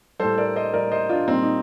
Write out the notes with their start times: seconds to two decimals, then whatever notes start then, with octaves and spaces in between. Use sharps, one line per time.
0.20 A2 G3 A4 C5
0.38 A#4 D5
0.56 C5 D#5
0.73 A2 G3 A#4 D5
0.92 C5 D#5
1.09 D4 F4
1.28 A#2 G3 C4 D#4
1.43 D#4